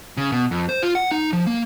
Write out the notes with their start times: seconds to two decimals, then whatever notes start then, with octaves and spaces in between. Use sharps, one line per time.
0.17 C#3
0.32 B2
0.51 F2
0.69 C5
0.83 F4
0.95 F#5
1.11 D#4
1.33 F3
1.47 A#3